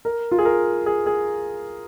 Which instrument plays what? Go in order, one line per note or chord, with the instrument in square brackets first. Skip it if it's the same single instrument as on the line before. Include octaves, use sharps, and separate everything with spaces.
[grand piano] A#4
F4
G#4
A#4
G#4
G#4